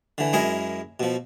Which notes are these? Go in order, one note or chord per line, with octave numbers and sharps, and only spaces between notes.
D3 E3
F#2 G#3 E4 A#4 D#5 G#5
B2 F3